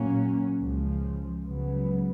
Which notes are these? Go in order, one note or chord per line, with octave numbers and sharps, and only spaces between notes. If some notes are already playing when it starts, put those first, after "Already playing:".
Already playing: A#2 F#3 A#3 C#4
C#2 C#3 F3
C#2 C#3 F#3 B3